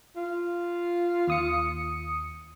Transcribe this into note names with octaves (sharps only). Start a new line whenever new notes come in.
F4
D#2 D#6 C#7